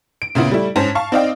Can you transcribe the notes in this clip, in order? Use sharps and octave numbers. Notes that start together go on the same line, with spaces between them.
D7
A#2 C#3 B3 E4
G3 A3 E4
G#2 C#4 C5 A5
F5 A5 C#6
C4 D#4 D5 D#5 F5 G5